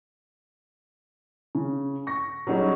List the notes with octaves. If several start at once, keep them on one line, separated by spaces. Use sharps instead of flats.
C#3
C#6 A#6
F#3 G3 C#4 D#4 G#4